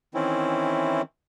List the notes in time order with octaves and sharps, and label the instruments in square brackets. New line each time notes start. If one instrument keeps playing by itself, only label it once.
[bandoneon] D#3 E3 C4 C#4 E4